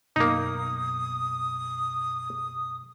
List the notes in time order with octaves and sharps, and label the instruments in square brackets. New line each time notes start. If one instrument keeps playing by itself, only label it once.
[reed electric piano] F#2 B2 [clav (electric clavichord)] A#3 D#4 [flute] D#6